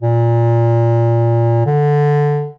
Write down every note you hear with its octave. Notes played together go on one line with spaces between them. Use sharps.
A#2
D3